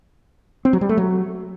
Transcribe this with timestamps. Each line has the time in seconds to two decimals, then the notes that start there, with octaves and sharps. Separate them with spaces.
0.65 C4
0.73 F#3
0.81 G3
0.89 A3
0.97 F#3